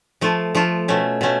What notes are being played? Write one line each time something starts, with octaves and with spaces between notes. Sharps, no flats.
F3 A3 F4
F3 A3 F4
B2 A3 C#4
B2 A3 C#4